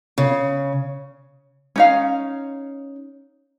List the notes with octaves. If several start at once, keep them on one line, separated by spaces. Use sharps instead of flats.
C#3
C#4 D#4 F5